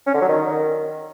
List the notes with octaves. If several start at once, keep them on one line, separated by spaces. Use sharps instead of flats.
C#4
D3
F#3
D#3